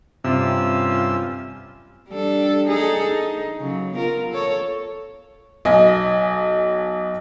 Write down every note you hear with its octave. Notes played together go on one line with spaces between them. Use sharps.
G2 C3 C#4 F4 E5 E6
G3 D4 A4
D#4 G#4 A4
D#4
C#3 F#3
B3 F4 A#4
A4 C#5
B1 D#5 G#5